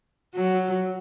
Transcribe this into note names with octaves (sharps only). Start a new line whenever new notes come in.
F#3